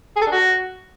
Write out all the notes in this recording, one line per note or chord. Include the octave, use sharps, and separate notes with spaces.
G#4
A4
D4
F#4